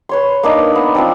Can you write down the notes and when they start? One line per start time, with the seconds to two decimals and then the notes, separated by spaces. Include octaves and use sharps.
0.09 B4 C#5 C6
0.43 A#3 D4 D#4
0.75 B3
0.95 C4 D4 F4